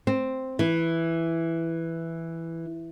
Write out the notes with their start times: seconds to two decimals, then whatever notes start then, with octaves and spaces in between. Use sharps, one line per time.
0.07 C4
0.59 E3